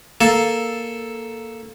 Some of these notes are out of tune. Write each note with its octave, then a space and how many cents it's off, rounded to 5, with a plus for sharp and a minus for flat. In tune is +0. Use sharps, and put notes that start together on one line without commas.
A#3 +0 A4 +0